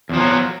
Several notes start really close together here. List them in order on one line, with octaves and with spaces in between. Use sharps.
E2 F3 F#3